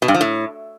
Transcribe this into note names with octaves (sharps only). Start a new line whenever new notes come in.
B2
G2
F3
A2